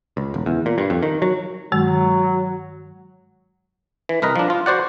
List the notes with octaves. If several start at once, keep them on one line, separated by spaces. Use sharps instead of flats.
C#2
E1
E2
A#2
G2
F2
D#3
F#3
G2 D#3 F#3 G#3
E3
C2 A#4 B4 D#5
F3 D4
F4
F#4 C5 D5 F#5